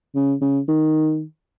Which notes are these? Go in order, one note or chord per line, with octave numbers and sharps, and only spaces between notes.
C#3
C#3
D#3